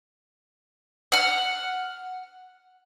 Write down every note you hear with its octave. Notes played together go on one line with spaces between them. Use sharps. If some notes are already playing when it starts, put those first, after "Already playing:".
F#5 F6